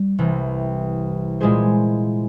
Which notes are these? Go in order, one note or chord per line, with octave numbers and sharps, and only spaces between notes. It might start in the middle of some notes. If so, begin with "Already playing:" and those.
Already playing: G3
C2 C3 E3
A#2 G#3 E4 G#4 C5